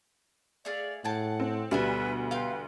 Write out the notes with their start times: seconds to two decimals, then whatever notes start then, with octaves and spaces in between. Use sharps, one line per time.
0.65 A3 G#4 D5 F5
1.04 A2 G#4 F#5 G5 A5
1.40 C4
1.71 D2 B2 G3 D4 B4 E5 G#5
2.31 B4 F5 G5 C6